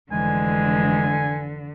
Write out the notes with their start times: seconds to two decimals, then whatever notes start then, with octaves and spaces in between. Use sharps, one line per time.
0.12 F1 D3 E3 G#3 G#5